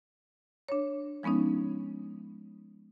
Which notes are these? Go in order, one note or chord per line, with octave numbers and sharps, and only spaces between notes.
D4 C#5
F3 G#3 B3 C#4 D#4